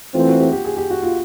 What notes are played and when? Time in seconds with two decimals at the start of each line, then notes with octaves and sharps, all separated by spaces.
0.14 E3 A3 C4 F4
0.28 F#4
0.40 G4
0.52 G4
0.65 G#4
0.77 G4
0.90 F#4
1.03 F4